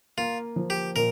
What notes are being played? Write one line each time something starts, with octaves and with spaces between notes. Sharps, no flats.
A#3 F4
F3
G4
A#2 A#4